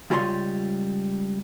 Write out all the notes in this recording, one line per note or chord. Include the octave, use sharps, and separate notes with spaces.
C#2 G3 F4 C#5 A#5 C6